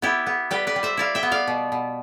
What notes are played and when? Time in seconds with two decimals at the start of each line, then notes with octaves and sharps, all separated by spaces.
0.02 B3 E4 G4
0.26 B3
0.51 G3 G4 B4
0.67 B4 D5
0.76 G3
0.83 C5 E5
0.97 E4 D5 F5
1.15 E5 G5
1.23 B3
1.31 D5 F5
1.47 B2
1.72 B2